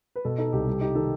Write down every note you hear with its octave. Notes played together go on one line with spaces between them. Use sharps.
B4
B2 A4
D#4 A4
C2 G4
G3
D#4 G4
D#3 A4